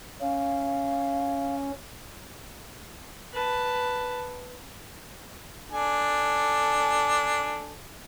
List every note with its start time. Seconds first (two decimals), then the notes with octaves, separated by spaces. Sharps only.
0.21 C#4 F5
3.33 B4 A5
5.72 D4 A4 G#5